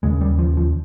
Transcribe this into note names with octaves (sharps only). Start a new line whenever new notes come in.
D#2 C#3 G#3
G3
F3
F3